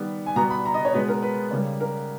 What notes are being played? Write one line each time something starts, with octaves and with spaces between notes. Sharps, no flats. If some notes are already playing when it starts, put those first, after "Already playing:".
Already playing: D#3 G3 B3
G#5
B2 G3 B3 A#5
B5
A#5
D#5
C#5
B2 G#3 B3 B4
A#4
B4
C#3 G3 A#3
A#4